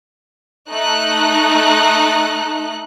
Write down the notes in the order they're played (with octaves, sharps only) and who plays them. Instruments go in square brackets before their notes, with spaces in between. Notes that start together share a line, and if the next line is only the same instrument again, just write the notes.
[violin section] A3 D#4 F#6